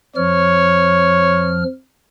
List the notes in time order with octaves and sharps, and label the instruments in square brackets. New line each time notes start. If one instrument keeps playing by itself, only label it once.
[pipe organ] F2 F3 F6 [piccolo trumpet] C#5